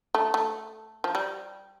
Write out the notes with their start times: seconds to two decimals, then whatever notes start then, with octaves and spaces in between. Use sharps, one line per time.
0.15 A3
0.34 A3
1.04 F3
1.15 G3